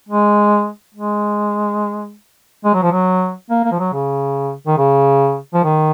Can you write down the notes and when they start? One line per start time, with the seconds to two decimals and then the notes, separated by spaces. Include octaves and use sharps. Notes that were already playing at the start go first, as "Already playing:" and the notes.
0.09 G#3
0.95 G#3
2.65 G#3
2.74 F#3
2.83 F3
2.92 F#3
3.50 A#3
3.64 A#3
3.72 F3
3.79 F#3
3.93 C#3
4.67 D#3
4.78 C#3
5.54 F3
5.64 D#3